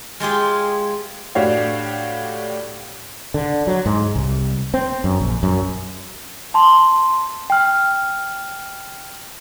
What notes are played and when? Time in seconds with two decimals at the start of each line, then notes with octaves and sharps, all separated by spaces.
0.20 G#3 F4 G4 G#4
1.35 A2 D4 F#4 G4 C#5 F5
3.34 D3
3.67 F#3
3.86 G#2
4.16 C2
4.74 C4
5.04 F#2
5.20 A#1
5.43 F#2
6.54 A5 C6
7.50 G5 F6